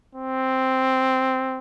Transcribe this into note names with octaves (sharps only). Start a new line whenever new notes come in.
C4